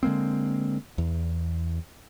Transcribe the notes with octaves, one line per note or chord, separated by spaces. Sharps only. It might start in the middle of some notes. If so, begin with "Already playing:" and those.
D3 G#3 A#3 C4
E2